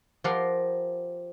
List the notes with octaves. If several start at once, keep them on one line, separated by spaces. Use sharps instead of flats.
F3 G4 A#4 F#5 C6